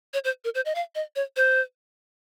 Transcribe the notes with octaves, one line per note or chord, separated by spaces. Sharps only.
C#5
C5
A#4
C5
D#5
F5
D#5
C#5
C5